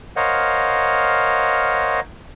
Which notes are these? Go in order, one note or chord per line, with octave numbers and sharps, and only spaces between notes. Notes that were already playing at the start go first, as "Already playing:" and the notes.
A#4 C5 C#5 D#5 F5 F#5